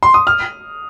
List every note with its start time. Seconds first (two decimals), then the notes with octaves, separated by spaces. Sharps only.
0.03 C6
0.14 D#6
0.27 F6